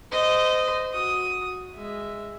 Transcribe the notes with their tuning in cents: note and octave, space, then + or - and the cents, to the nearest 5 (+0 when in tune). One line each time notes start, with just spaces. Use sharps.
C5 -25 D#5 -5
F#4 -10 D#6 +5
G#3 -10 E5 +0